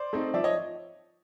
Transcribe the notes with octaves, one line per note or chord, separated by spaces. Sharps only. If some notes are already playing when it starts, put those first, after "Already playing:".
Already playing: C5 D5
A3 C4 D#4
F3 D5 E5
C#5 D#5